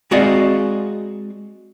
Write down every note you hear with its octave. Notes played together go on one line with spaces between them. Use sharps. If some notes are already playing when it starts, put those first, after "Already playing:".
G#3 C4 F#4 D5 D#5 F5